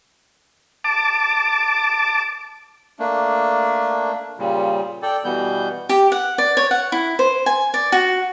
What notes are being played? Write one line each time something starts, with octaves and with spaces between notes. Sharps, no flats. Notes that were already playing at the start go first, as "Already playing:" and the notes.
A5 D6
A3 A#3 D4
A#2 C#3 G3
A4 D5 G5
B2 E3 G3 B3 G6
G4
F#5
D5
C#5
F#5
E4
C5
G#5
D5
F#4